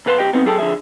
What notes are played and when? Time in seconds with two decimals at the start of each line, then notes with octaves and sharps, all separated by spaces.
0.06 B1 B2 B4 F5 A5 C6
0.18 C2 F3 G4 D#5 G5
0.33 F#2 B3 C4 D#4
0.45 F#3 G#4 A4 G5 A5
0.59 D3 F3 G#4 E5